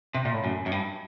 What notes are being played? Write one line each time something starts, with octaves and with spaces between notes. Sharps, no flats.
C3
A#2
A2
F#2
F#2
G2